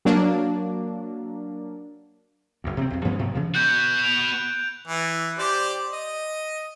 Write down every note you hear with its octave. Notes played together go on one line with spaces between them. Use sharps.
F#3 A#3 D4
F#1 D2
C3 A#3 C4
B1 F2
G2 F3 B3 C#4
G#2 C3 F3 F#3
C#3 E3 F3
B3 F#4 F#6 G6
D7 F7
E3
G4 C5 D5
D#5